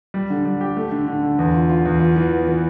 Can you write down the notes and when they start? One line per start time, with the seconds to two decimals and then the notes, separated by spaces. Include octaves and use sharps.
0.14 G3
0.30 D3
0.45 G3
0.61 G4
0.77 A3
0.92 D3
1.08 D3
1.23 D3
1.39 E2
1.54 F4
1.69 F4
1.85 E2
2.00 F4
2.16 E3
2.32 B3
2.47 E3